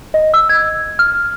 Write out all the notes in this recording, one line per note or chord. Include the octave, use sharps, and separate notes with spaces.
D#5
E6
G#6
F6